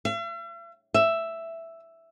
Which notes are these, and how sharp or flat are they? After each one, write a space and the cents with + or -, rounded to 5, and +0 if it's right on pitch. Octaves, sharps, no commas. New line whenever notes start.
E5 +45
E5 +5